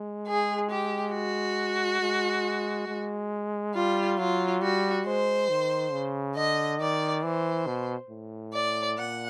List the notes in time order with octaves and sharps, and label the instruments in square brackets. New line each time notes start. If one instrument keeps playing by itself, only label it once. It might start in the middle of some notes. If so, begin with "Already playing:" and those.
Already playing: [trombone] G#3
[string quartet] G#4
G4
F#4
[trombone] G#3
G#3
[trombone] G3 [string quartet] F4
[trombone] F#3 [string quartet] F4
[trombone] G3 [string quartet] F#4
[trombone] G#3 [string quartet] C5
[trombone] D#3
C#3
[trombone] D3 [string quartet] D#5
[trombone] D#3 [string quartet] D5
[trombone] E3 [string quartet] C5
[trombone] B2
A2
[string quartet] D5
[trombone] A#2 [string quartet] F#5